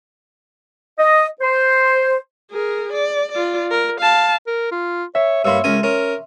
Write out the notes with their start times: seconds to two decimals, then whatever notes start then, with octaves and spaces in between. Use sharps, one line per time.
0.99 D#5
1.40 C5
2.51 G#4 A#4
2.93 D5
3.32 F4 D5
3.71 A#4
4.01 F5 A5
4.47 A#4
4.71 F4
5.15 C#5 E5
5.45 G2 A#3 C#5 B5 C6 E6
5.64 C#2 C#4 A#4 G#5
5.83 C#4 A#4